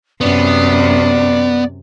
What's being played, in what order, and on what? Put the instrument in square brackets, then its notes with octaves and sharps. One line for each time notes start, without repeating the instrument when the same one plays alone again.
[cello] F#2 C3 [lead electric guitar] B3 [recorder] D5